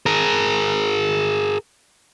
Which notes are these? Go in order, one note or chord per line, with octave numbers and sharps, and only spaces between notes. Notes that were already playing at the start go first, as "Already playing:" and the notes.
G#4 A#4